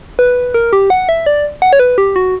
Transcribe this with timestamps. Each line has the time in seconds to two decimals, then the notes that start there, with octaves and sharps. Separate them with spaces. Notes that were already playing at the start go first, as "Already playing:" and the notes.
0.19 B4
0.54 A#4
0.73 G4
0.90 F#5
1.09 E5
1.26 D5
1.62 F#5
1.73 C#5
1.80 B4
1.98 G4
2.16 F#4